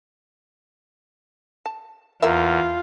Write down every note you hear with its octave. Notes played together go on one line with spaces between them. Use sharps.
A5
E2 A#3 F4 A#4 E5